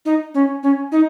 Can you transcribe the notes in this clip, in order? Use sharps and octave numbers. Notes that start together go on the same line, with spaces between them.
D#4
C#4
C#4
D#4